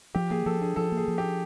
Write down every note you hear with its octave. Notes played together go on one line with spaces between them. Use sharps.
F3 G4
A#3 G#4
F3 A4
D4 G#4
F3 A4
A#3
G#4
F3
D4 G4